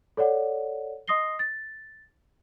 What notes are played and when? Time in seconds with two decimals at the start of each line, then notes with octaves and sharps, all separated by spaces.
0.17 A4 C#5 D5 F#5
1.08 D#5 C6 D#6 A#6 C7 G7
1.39 A6